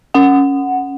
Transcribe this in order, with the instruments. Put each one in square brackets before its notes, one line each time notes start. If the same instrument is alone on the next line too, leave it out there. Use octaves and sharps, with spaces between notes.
[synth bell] C#4 F#5